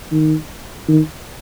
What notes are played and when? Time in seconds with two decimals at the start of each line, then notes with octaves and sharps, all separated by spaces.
0.12 D#3
0.88 D#3